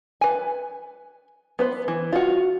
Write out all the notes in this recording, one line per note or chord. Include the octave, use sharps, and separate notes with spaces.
B4 G#5
B3 B4 C5
E3
F4 F#4